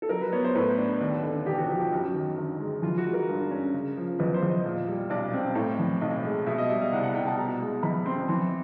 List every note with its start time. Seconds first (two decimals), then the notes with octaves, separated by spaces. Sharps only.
0.02 A4
0.09 F#3 A#4
0.21 B4
0.32 B3 C#5
0.44 C5
0.55 A2 B4
0.78 D4
1.00 D#2
1.23 D3
1.46 E1 G4
1.58 F#4
1.69 F3 G4
1.81 G4
1.92 F#2 F#4
2.14 D#3
2.38 G1
2.60 G#3
2.82 E3 F4
2.98 F#4
3.06 G#3
3.13 A#4
3.29 G2
3.51 C#4
3.74 C#3
3.97 F3
4.19 E2 B4
4.34 C5
4.43 E2
4.49 D#5
4.65 A#2
4.88 G3
5.10 B1 D5
5.33 C4
5.55 A2
5.79 E3
6.01 B1 D#5
6.25 G#3
6.47 B2 E5
6.58 D#5
6.69 G3 E5
6.81 F5
6.92 C2 F#5
7.03 F#5
7.15 C2 G5
7.26 A5
7.37 B2 A#5
7.61 G#3
7.83 E2 B5
8.06 C4 C6
8.29 E3 C6